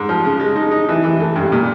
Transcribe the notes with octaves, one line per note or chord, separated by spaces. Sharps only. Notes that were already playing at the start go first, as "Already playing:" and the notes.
Already playing: G#2
F3
C#3
G#3
D#4
D#4
E3
E3
A3
G2
A#2